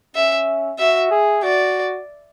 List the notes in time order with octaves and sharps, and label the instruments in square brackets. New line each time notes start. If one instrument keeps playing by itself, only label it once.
[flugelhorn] C#4 [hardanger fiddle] E5
[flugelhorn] F#4 [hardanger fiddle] E5
[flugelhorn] G#4
[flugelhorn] F#4 [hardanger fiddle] D5